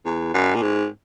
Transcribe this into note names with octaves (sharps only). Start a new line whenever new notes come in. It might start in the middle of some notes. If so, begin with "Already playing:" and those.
E2
F#2
A#2
G#2